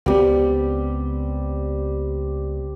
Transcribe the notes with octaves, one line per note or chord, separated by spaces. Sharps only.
C#2 G3 B3 C4